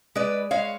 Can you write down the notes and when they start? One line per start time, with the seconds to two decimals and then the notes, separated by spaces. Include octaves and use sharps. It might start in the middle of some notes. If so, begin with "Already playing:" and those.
0.15 G#3 B4 D5
0.51 G#3 C#5 F5